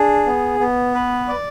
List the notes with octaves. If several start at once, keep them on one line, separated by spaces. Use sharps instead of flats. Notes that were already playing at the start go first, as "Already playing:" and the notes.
Already playing: D4 G#4
B3
B3
B4
D5